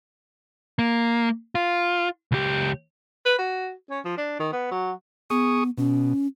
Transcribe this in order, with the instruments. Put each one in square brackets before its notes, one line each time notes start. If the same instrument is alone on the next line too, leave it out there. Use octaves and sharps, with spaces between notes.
[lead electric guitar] A#3
F4
C#2 G4
[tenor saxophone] B4
F#4
C#4
F3
D4
D#3
B3
F#3
[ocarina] B3 [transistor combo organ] G#4 C#6 D#6
[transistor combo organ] B2 [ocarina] C#4